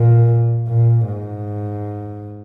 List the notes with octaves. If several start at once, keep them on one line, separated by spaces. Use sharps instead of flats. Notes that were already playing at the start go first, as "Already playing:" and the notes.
Already playing: A#2
A#2
G#2